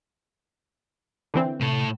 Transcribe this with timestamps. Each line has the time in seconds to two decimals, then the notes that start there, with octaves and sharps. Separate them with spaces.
1.34 D3 E3 C4
1.60 A2 C3 A4